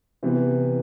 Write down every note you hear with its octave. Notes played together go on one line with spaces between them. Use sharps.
C3 E3 B3